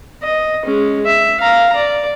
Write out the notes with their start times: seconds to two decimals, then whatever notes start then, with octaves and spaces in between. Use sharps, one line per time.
0.23 D#5
0.65 G#3 C#4
1.06 E5
1.40 F5 A#5
1.76 D5